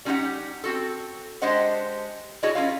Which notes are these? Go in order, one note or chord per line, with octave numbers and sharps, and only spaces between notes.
G3 C#4 D#4 F4 G4 F#5
C4 F#4 A4
G#3 D4 G4 C5 D#5 F#5
D4 E4 F#4 G#4 C#5 D#5
C#4 E4 F4 F5